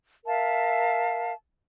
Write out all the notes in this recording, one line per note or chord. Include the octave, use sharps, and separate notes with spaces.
A#4 E5 F5 A5